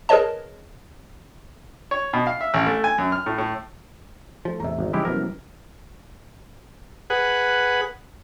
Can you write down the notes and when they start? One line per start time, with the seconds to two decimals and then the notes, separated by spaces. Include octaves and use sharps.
0.09 G#4 A#4 B4 C#5 D#5 A5
1.91 C#5
2.13 B2
2.27 F5
2.41 E5
2.54 A1
2.67 A3
2.84 G#5
2.98 F#2
3.12 F6
3.26 A2
3.38 A2
4.45 F3 A3
4.60 E2 A2 C3 E5 A#5
4.79 G#1
4.93 C#3 F3 G#3 E4 G4
5.05 C2 F#2 F3 F#3 B3 A#4
7.10 G#4 B4 F#5